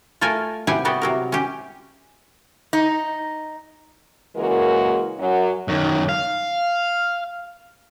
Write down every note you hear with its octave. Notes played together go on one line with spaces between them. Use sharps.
A3 F4 A4 A#4 G#5
C3 E4 G4 F#5 G#5
G3 B3 F#4 G4
C3 F#3 A#4
C#4 G4
D#4
C#3 E3 G#3 A#3 F#4 A#4
F#2 F#3
F#2 D#3
F5